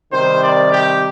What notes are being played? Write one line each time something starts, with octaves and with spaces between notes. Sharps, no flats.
C3 D#3 G3 C5
D5
G4